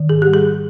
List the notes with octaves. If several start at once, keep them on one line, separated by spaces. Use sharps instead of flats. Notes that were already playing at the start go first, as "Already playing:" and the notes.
Already playing: D#3
G#2 G#4
G4
G3
G#4